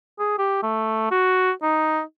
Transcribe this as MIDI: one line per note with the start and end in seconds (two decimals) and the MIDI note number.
0.19 0.36 68
0.39 0.58 67
0.63 1.11 57
1.11 1.52 66
1.63 2.02 63